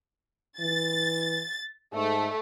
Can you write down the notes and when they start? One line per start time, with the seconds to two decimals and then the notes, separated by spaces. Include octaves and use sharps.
0.60 E3 A6
1.94 G#2 A3